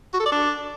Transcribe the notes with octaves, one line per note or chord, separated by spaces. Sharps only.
F#4
A4
D5
D4